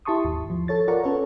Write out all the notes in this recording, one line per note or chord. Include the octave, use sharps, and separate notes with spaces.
E4 G4 A5 C6 C#6 D#6
D#2 G#2
F3
A4 C#5 A6
F4 A#4 D5 F#5 A#5 C#6
C#4 A4 B4 C#5